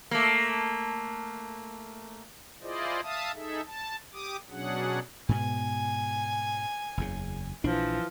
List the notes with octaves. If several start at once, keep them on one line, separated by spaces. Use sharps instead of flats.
A3 A#3
E4 F4 G#4 C5 D5 D#5
E5 F5 A5 D#6
D#4 G#4 A4 E5
A5
G4 D6 D#6
B2 F#3 C#4 D4 G#4 F#5
G#2 B2 B3 G#5
F#1 E2 C#3
A#1 E3 F3 D4